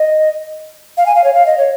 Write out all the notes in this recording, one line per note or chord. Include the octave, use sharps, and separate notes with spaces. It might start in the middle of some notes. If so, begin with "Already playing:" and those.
Already playing: D#5
F5
G#5
F5
C#5
F5
D#5
C#5